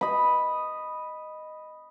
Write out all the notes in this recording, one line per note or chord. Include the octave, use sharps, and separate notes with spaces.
D#5 B5